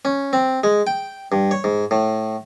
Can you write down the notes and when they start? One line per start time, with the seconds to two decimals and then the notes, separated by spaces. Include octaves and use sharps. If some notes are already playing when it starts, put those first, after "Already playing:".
0.05 C#4
0.33 C4
0.64 G#3
0.87 G5
1.32 G2
1.51 C#5
1.64 G#2
1.91 A2